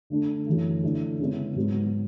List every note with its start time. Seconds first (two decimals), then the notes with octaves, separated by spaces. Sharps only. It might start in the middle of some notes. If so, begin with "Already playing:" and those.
0.10 D3 A3 D4
0.47 F#2 E3 A3
0.84 D3 A3 E4
1.19 C#3 G#3 B3 E4
1.56 G#2 F#3 B3